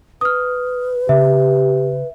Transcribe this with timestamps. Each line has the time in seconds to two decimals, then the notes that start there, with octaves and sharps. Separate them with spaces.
0.21 B4 D#6 F6
1.09 C#3 G4 E5